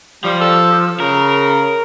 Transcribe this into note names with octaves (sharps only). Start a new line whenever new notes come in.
F3 G3
A4
C#3 A#4